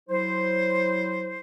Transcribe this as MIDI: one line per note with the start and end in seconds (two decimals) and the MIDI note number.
0.09 1.40 54
0.09 1.40 64
0.09 1.40 72